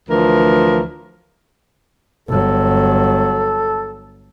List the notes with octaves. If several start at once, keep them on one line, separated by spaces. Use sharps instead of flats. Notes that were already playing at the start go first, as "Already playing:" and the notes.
D2 E3 F3 A#4
G1 F#3 A4